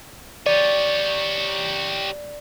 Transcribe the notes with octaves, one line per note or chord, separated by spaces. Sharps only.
G4 C#5 D5